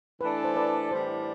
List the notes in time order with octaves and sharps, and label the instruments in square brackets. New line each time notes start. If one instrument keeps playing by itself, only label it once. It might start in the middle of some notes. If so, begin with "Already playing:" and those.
[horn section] E3 A3 D4 A4 [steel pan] B4
[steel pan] C5
B4 D5
[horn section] A2 E3 G3 D4 [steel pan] C5